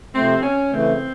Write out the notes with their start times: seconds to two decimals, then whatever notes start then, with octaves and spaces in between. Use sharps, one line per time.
0.14 C3 F3 A3 C4
0.43 C#4
0.71 C#3 E3 A3 C4